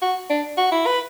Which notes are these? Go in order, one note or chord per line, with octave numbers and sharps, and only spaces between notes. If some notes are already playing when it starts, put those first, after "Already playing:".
F#4
D4
F#4
E4
B4